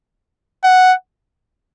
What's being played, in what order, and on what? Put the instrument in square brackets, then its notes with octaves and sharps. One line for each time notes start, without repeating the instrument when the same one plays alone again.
[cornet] F#5